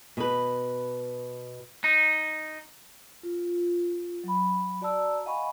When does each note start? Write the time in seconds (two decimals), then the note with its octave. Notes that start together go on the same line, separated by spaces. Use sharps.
0.17 B2 B4
1.84 D#4
3.23 F4
4.24 F#3 B5
4.81 F#4 D5 A5 A#5 E6
5.26 D#5 F5 F#5 G#5 B5 C#6